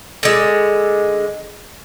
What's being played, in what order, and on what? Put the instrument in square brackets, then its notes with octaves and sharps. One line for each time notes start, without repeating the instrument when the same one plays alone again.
[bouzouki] D3 G#3